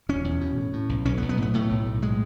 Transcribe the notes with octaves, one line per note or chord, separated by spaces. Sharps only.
E1 C#4
E2
B2
A2
A2
B1
B1 C#4
B3
B1
B3
A2
B3
A2 A3
B1
A2
A2 G#3